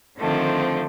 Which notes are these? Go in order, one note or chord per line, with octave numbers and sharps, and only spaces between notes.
D3 D#3 F3 A3 C4